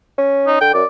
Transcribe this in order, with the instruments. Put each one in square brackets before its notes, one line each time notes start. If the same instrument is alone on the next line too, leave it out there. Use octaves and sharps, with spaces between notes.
[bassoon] C#4
[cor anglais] D#4
[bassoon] D3 [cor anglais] G5
[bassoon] F#2 [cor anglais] D5